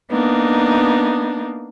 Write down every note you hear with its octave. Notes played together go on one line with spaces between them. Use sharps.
A#3 B3 D4 D#4